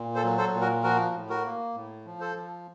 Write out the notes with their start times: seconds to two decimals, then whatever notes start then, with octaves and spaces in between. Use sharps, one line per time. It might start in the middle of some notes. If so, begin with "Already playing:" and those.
Already playing: A#2
0.15 A4 C5
0.24 F#3
0.38 A4 C5
0.54 A#2
0.61 F#4 A#4
0.83 F3 F#4 A#4
1.15 A2
1.30 F#4 A#4
1.44 A#3
1.75 A2
2.05 F3
2.20 A4 C5
2.36 F3